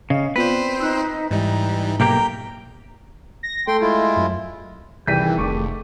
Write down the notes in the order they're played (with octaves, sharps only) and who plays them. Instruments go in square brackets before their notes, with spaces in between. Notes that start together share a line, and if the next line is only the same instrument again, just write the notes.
[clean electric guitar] C#3 [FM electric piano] D#5 F5
[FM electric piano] B3 F4 D5 [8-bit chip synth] C4 C5 [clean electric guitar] B4
[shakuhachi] D#4 [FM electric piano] E6 F#6
[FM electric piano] G#2 E5 [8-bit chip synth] E3 G3 [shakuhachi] D#4
[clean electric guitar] B1 A#3 G4 [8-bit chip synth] G5 [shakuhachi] A#5
[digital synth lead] A#6
[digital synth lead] A3 [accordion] G5 C6
[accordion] G#3 E4 F4
[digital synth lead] F#2
[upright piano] C2 B6 D#7 [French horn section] D#3 G#4 [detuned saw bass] E3 [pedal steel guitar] G5 G6
[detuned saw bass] F1 [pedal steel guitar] A3 [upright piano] C#6 D6